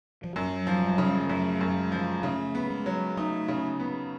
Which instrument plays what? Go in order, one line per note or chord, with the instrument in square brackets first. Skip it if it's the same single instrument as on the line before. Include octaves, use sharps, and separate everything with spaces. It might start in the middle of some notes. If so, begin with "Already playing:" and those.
[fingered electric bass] F3
[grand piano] F#2 [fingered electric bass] F#3
[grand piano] F3
[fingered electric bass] G3
[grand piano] C#3 [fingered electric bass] F#3
[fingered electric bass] G3
G#3
[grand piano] F#2 [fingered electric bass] A3
[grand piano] F#2
[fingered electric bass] A3
G#3
[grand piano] F3
[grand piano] C#3 [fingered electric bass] A3
[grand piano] B3
[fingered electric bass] G#3
[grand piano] F#3
[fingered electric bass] A3 [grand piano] D#4
[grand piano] C#3
B3